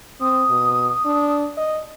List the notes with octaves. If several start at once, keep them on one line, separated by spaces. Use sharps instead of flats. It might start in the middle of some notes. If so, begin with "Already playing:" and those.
C4 D#6
B2
D4
D#5